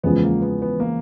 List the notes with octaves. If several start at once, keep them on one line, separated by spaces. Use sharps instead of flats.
E2 C#3 F3 G#3 B3
A#3
B3
B3
A#3